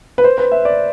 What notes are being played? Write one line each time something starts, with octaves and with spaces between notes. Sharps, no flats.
B4
C5
B4
E5
D5